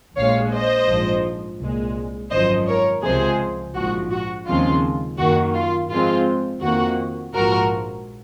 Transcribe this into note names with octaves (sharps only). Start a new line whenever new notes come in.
A#1 A#2 G#3 C#5 F5
C5 D#5
A#1 G#2 F3
C2 A#2 G#3
G#1 F#2 F3 C5 D#5
A#4 C#5
C#2 C3 F3 G#3 G#4 C5
A#1 G#2 F3 F#4
F#4
D#2 C#3 F3 G#3 C4 F4
F#2 D#3 A#3 F#4
F4
G#2 F3 G#3 C4 F4
F2 D#3 A#3 F#4
A#1 G#2 F3 F#4 A#4